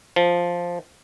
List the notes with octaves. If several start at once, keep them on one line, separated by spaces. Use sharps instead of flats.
F3